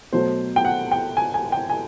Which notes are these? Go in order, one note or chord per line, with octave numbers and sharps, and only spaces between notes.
B2 F#3 A3 C5
G5
F#5
G5
G#5
G#5
G5
G#5